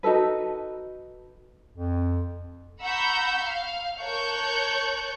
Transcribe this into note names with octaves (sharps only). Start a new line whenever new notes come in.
D#4 F#4 A4 B4
F2
F#5 A#5 B5 C#6 E6 G6
F5
A#4 C#5 A5 C#6 F#6 G6